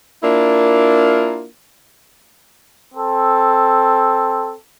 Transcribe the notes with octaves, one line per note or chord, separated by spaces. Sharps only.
A#3 D4 E4 F4 A#4
C4 A4